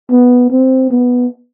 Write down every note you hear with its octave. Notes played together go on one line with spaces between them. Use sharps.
B3
C4
B3